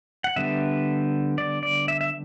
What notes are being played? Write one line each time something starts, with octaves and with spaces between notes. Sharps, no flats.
F#5
D3 G3 B3 E5
D5
D5
E5
E5